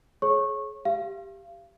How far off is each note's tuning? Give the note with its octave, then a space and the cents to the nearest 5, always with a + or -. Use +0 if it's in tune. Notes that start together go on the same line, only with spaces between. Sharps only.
G#4 +35 C#5 -25 C#6 -20
G4 +0 F5 -35